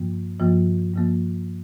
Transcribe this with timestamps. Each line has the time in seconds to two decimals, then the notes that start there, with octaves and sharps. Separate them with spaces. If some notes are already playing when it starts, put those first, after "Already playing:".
Already playing: G2 F3 A#3
0.40 G2 F3 A#3
0.94 G2 F3 A#3